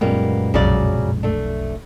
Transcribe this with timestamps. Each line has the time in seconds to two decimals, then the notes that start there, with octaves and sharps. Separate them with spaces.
0.01 F#2 A#2 G3 G#3 A#3 B3
0.54 B1 F2 C#3 F#3 D5
1.23 A3 D4